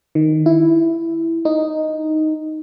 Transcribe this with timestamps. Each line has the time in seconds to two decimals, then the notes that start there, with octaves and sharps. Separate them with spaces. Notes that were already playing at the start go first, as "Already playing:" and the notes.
0.15 D#3
0.46 E4
1.45 D#4